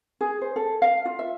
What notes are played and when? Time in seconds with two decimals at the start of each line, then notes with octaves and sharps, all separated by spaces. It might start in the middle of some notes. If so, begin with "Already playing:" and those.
0.21 G#4
0.41 C5
0.56 A4
0.82 F5
1.05 F4
1.19 E5